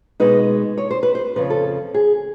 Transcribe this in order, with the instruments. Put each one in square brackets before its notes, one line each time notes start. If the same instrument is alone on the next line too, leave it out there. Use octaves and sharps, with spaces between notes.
[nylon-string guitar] B2 G#3 B3 D#4 B4
C#5
C5
B4
C5
F2 C#3 F3 B4
A4
G#4